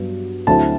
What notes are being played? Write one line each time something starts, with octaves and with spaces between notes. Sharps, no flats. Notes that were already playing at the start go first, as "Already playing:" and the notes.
Already playing: G2 F#3 B3
D2 D3 F#3 C4 E4 A5